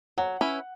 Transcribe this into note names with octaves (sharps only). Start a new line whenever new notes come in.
F#3 F#5
C#4 E4 B4